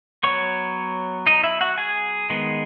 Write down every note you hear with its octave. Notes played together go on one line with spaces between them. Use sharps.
F#3 B3 C#5 C#6
D#4 D#5
E4 E5
F#4 F#5
G#4 G#5
D#3 G#3 B3